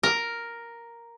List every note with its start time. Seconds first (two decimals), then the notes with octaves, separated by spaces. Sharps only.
0.03 A#4